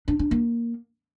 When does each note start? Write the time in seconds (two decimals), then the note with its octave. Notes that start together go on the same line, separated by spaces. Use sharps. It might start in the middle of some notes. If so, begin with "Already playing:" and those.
0.08 D4
0.19 D4
0.31 A#3